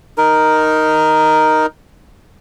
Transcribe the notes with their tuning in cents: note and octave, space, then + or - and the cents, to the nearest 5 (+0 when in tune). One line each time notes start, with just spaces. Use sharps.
D#4 +0 A#4 +5